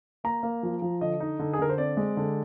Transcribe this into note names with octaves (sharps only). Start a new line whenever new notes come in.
A#3 A#5
A#3
F3
F3
D3 D#5
D#4
D3
G#4
D3 A#4
C5
C4 D5
G#3
D3